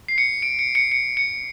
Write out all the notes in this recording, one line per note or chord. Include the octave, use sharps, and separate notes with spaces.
C7
C#7
D7
C#7
C#7
C#7
C#7